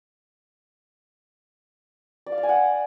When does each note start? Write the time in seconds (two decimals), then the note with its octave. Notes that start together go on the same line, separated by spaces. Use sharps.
2.26 D5
2.32 F5
2.38 D5
2.43 G#5
2.49 F#5